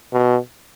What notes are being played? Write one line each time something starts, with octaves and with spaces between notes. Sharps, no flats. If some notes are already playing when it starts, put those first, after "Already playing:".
B2